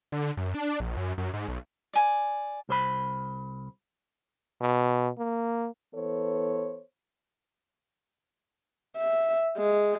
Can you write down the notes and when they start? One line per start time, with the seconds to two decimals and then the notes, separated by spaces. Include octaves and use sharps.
0.12 D3
0.37 F#2
0.54 D4
0.80 A#1
0.97 F#2
1.18 F#2
1.34 G#2
1.48 B1
1.93 D5 G#5
2.69 C2 C5 B5
4.61 B2
5.18 A#3
5.95 E3 B3 A4 C5 C#5
8.97 E5
9.58 G#3